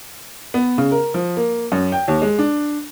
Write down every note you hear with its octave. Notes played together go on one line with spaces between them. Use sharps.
B3
C#3
A#4
F3
A#3
F#2
G5
D#2
G#3
D4